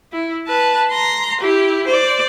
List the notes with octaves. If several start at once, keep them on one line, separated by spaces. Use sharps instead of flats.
E4
B4 A5
A#5 C6
E4 G4
C5 D5